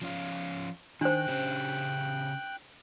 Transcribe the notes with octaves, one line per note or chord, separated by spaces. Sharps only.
F3 C#4 F4
D#3 D4 C5 G5 F#6
C#3 C#4 G4